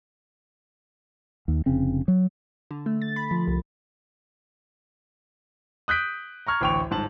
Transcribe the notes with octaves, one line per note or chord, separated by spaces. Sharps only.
D#2
F1 C#3 C4
F#3
D3
A3
A6
B5
F3
C2
D#6 F#6 G6 B6 D7
A#5 C#6 F6 G#6
A1 D2 G5 C#6 F7
G1 G#2 A5 F#7